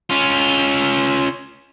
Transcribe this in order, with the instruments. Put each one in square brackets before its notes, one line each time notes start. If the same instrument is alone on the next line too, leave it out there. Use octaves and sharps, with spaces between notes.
[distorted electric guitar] C#4 F4